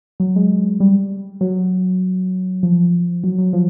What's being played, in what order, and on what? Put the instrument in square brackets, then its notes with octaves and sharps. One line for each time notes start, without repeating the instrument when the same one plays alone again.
[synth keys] F#3
G#3
G3
F#3
F3
F#3
F#3
F3